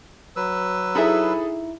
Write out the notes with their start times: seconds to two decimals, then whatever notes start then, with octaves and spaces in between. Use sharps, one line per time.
0.36 F#3 B4 E6
0.95 D#4 E4 G#4 A4 E5 B5